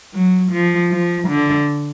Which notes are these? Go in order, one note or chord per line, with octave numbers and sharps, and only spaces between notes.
F#3
F3
F3
D3